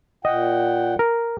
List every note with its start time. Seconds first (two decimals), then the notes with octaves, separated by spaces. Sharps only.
0.25 A#2 D#5 F#5 G5
0.99 A#4